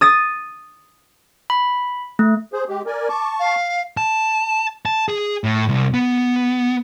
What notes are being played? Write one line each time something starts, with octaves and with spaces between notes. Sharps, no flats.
D#6 A6 D#7
B5
A3
G#4 C5
G#3 G4
A#4 D5 G#5
A5 C#6 D6
F5
A5
A5
G#4
A2
C2
B3